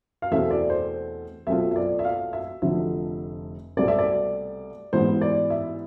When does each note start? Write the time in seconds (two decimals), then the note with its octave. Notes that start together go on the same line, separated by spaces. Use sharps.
0.22 F5
0.31 E2 B2 A3 C4 E5
0.51 D5
0.70 C5
1.47 B1 B2 A3 C4 F4 E5
1.71 E5
1.76 D5
1.99 E5
2.05 F5
2.33 E5
2.62 F1 F2 D3 A3 E5
3.77 C2 B2 A3 C4 D5
3.88 E5
3.99 D5
4.93 A1 G#2 E3 B3 C5
5.21 D5
5.50 E5